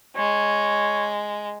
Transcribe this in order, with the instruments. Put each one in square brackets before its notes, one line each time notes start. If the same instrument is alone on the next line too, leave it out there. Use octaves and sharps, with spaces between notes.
[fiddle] G#3 [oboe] C#5